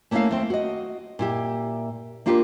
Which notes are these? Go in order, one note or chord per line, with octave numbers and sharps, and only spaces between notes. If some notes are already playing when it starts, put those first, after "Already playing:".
A3 A#3 C#4 D#4 E4 F5
D#2 A3 C4
F#4 D#5
A#2 E4 G4
A#3 D4 F4 G4 G#4 A#4